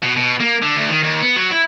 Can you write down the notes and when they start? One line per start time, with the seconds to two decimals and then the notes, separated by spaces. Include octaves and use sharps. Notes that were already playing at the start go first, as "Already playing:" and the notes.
0.03 B2
0.17 B2
0.40 A#3
0.62 D3
0.76 D2
0.89 D#3
1.03 D#2
1.22 B3
1.36 F#3
1.51 E4